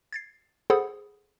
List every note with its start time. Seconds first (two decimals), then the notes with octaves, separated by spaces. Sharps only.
0.13 G#6 A6 C7
0.70 G#4 A4 C5 F#5 B5 D#6